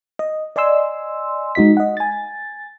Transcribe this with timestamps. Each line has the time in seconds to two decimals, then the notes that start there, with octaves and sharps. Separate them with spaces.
0.19 D#5
0.56 D5 D#5 G#5 C6 E6
1.55 G#3 D#4 F#4 D#5 B6
1.77 D#5 F#5
1.97 G#5 A6